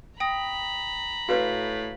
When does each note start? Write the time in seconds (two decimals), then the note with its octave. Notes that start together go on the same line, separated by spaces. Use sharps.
0.20 G5 A#5 B5 D#6 A#6
1.29 A2 F#4 B4 C#5 F5